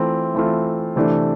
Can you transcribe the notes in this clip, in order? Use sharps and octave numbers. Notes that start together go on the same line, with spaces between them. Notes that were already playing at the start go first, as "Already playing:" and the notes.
Already playing: E3 A3 C4 F4
E3 A3 C4 F4
C3 E3 A3 D4